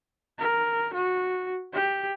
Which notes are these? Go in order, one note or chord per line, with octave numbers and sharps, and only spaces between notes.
A#4
F#4
G4